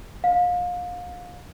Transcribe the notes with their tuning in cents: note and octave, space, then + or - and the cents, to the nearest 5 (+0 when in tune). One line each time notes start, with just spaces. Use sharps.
F5 +30